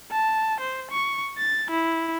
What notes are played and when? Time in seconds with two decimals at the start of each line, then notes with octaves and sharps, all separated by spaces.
0.11 A5
0.60 C5
0.91 C#6
1.38 A6
1.71 E4